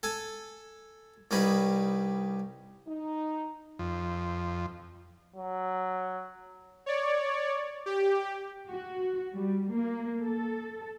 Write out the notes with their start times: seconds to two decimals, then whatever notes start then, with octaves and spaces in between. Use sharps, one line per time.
0.03 A4 G#5 A5
1.31 C2 G3 C#4 D#4 B4 B5
2.87 D#4
3.79 F2
5.36 F#3
6.86 C#5 D5
7.86 G4
8.70 F#4
9.34 G3
9.72 A#3
10.21 A4